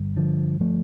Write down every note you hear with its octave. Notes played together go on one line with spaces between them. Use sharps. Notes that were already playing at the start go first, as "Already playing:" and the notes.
Already playing: G1 G2
D3 F3
F3 A3